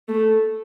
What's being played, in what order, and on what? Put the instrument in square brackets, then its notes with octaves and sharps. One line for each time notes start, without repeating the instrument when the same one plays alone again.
[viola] A3